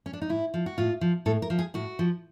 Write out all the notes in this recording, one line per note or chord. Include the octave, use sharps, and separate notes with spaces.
C#4
D4
D#4
A2 E4
F3
F#4
A2 F4
F3
A2 A4
A#4
F3
G#4
A2 F#4
F3